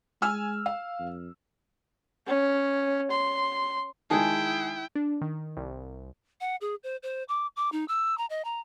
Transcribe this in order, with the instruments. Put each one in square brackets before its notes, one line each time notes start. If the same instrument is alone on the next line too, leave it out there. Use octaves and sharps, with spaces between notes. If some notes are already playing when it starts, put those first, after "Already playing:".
[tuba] G#3 [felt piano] G#5 E6 F6
[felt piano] F5
[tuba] F2
[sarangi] C#4
C6
[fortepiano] D#3 G#3 [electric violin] E4 G5 [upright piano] G#4 A5
[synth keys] D4
D#3
C2
[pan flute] F#5
G#4
C5
C5
D6
D6
D#4
E6
A#5
D#5
A#5